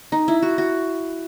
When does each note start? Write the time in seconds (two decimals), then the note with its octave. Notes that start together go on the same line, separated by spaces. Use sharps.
0.12 D#4
0.28 E4
0.42 F#4
0.58 F#4